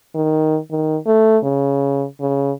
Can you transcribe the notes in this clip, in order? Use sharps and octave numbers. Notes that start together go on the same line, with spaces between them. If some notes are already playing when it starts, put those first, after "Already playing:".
D#3
D#3
A3
C#3
C#3